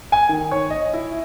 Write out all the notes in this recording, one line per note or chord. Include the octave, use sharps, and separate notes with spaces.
G#5
D#3
C#5
D#5
E4